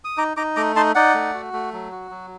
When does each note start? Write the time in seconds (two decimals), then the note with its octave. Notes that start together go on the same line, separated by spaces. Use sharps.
0.05 D#6
0.17 D#4 A#5 D6
0.37 D#4 A#5 D6
0.56 A3 A#5 D6
0.76 D#4 A5 C6
0.95 D#4 D5 F#5
1.14 A3
1.34 F#4
1.53 A3
1.73 F#3
1.92 F#4
2.11 F#3